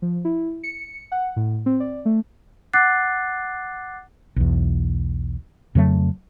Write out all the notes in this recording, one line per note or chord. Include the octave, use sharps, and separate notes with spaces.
F3
E4
C#7
F#5
A2
C4
D5
A3
F#5 D6 F#6 A6 C7
B1 E2
F2 C#3 F#3 A3